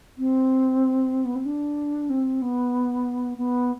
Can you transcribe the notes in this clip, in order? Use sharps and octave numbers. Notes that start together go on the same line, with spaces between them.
C4
B3
C4
D4
C4
B3
B3